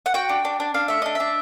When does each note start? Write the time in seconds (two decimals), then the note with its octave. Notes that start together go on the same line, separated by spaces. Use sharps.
0.06 F#5
0.14 F#4 G5
0.29 D4
0.45 D4
0.60 D4
0.74 D4 F5
0.88 A3 E5
1.02 D4 D#5
1.15 D4 E5